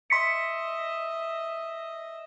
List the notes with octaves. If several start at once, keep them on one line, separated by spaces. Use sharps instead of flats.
D#5 E5 C6 B6 C#7